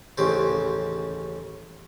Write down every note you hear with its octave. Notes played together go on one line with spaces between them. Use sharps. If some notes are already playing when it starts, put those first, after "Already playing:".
A1 D#2 C#3 C5